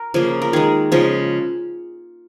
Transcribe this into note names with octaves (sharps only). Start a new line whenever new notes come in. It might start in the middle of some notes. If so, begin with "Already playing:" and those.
Already playing: A#4
C#3 F3 A#3
A#4
D#3 G#3 G#4
C#3 F3 G#3